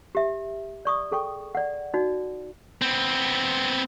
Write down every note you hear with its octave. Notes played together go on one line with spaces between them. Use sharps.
G4 E5
D5 C#6 D#6
G#4 A4 G5 C#6
D5 F#5
D#4 F#4 D5
B3 C4